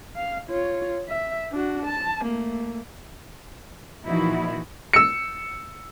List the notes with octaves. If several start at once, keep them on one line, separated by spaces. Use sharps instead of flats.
F5
F4 C#5
E5
D4 F#4
A5
A3 A#3
A#2 E3 F3 D#4 E4 F#4
E6 C#7